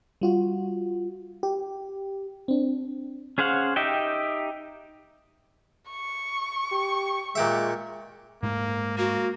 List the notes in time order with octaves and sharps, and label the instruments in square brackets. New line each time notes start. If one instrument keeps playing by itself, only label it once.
[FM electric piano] G3 F4 F#4
G4
C4 D4
[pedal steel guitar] C#4 G#4 C5 F5 F#5
D#4 G4 D#5 E5 G5
[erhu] C#6
[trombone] G4
[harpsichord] A#2 G4 E5 [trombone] G#3
[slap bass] G#2 A3 [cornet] A#3
[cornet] A#3 [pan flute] F#4